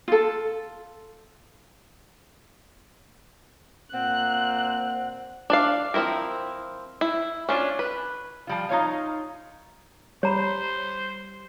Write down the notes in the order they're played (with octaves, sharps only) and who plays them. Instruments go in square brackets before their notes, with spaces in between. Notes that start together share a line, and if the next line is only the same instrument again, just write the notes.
[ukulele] F4 A4
[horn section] A#2 C4 [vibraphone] F#5 [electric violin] F#6
[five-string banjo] D4 D5 F5
F3 C4 C#4 E4 A#4
E4
C#4 D4 F4
B4
[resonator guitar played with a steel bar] F3 G3 F4
D#4 F4 C#5 F5
[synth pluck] G3 [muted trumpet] C5 [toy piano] C#5 A#5 B5